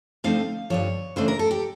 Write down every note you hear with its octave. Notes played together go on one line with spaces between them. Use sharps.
D3 F3 A3 C4 D#4 F5
G2 D3 F3 C#5
C#3 E3 A3 D4 C5
A#4
A4
G4